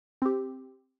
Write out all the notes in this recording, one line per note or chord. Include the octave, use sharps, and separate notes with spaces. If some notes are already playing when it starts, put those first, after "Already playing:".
C4 G4